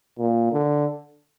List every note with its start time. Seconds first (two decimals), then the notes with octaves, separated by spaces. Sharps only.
0.19 A#2
0.52 D3